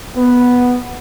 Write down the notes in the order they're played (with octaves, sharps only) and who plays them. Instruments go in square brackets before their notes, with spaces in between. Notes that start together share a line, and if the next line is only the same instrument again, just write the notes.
[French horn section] B3